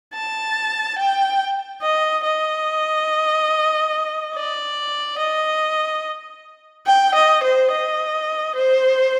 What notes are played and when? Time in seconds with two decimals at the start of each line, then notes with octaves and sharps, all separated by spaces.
0.14 A5
0.98 G5
1.82 D#5
2.24 D#5
4.35 D5
5.19 D#5
6.87 G5
7.15 D#5
7.43 C5
7.71 D#5
8.55 C5